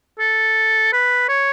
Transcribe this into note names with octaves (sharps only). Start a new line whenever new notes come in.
A4
B4
C#5